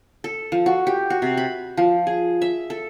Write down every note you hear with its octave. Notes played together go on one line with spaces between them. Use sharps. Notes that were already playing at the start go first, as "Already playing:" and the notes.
A4
F3
F#4
G4
F#4
C3
B5
F3
G#4
E5
A4